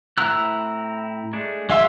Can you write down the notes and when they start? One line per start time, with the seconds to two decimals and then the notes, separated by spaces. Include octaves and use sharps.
0.18 A2 C4 E4 A#5 E6 F#6
1.33 G#3 A3 D4
1.70 F#3 G#3 E5 F5 C6